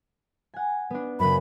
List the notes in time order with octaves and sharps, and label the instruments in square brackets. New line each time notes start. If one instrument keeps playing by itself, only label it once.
[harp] F#5 G#5
B3 D4
[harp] F#2 C#3 [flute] B5